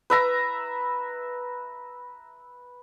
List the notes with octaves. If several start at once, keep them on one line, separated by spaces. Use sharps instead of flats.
B4 E5 A#5